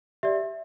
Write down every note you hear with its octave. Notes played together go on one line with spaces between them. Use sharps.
G4 D5 E5